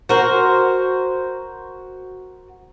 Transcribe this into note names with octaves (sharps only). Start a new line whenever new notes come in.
F#4 A#4 C5